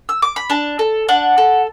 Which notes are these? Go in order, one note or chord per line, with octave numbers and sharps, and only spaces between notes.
E6
D6
B5
D4 A5
A4
D4 F#5
A4